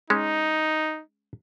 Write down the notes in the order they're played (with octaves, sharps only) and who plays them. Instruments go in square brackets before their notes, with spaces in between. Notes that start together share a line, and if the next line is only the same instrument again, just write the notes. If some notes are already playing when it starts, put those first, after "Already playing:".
[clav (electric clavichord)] G#3 C#4 [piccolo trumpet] D#4